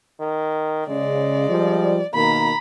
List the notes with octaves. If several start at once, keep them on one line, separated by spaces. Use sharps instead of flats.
D#3
C#3 G#3 D5
F3 G3
B2 D#3 A#3 A#5 B5